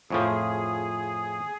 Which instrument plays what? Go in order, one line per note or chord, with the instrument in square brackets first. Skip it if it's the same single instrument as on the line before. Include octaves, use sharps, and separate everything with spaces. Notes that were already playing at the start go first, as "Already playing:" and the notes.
[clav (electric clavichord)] F2 A2 F3 [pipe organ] G#4